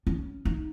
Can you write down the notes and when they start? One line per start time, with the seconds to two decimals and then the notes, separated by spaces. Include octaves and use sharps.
0.07 C#4
0.45 D#4